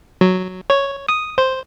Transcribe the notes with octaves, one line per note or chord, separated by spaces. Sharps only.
F#3
C#5
D#6
C5